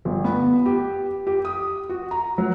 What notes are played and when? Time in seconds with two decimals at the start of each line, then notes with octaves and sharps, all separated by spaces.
0.05 G1
0.24 B3
0.66 G4
1.27 G4
1.45 D#6
1.89 F#4
2.11 A#5
2.38 F#3